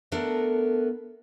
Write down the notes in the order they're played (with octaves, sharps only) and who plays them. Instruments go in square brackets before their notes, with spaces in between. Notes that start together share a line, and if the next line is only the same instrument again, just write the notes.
[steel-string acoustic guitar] A3 B3 D4 A4 A#4